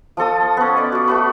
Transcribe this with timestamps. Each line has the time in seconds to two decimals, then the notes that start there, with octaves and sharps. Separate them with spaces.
0.17 F3 F4 A4 D#6
0.57 B3 C#4
0.77 D5 D#5
0.92 F#4 D6
1.08 A3 F#4 B4